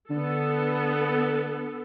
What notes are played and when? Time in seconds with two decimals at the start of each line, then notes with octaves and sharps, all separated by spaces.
0.10 D3 B3 A4